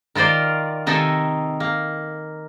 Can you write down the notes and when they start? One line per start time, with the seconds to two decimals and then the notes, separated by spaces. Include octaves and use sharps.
0.15 D#3 F4 A#4 C5 D5
0.86 C3 D#3 D#4 A4 E5 G#5
1.60 A#3